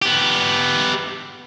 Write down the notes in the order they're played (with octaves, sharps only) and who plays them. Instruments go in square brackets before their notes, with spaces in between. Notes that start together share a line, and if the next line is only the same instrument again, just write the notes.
[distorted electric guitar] B3 G4